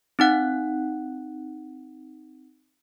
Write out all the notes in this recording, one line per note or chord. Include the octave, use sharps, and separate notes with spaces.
C4 D#4 F#5 F#6